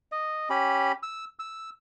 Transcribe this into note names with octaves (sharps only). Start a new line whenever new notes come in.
D#5
C#4 G4 B5
E6
E6